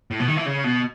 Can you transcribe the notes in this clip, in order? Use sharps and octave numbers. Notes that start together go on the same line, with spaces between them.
A2
B2
D#3
E3
C#3
B2